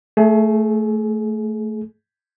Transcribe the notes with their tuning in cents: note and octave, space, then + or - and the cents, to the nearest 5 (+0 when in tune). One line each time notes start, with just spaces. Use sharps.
A3 +0 G#4 +30